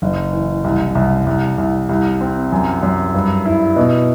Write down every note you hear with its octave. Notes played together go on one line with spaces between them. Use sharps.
F#1
E3
C2
C2
C2
C2
C2
C4
F#2
F#2
G2
E4
B2